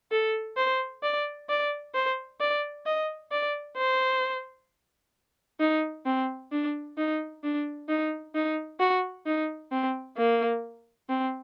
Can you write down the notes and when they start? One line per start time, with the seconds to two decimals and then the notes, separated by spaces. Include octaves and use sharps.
0.12 A4
0.57 C5
1.03 D5
1.49 D5
1.94 C5
2.40 D5
2.86 D#5
3.32 D5
3.77 C5
5.60 D#4
6.06 C4
6.52 D4
6.98 D#4
7.43 D4
7.88 D#4
8.35 D#4
8.80 F#4
9.26 D#4
9.71 C4
10.17 A#3
11.09 C4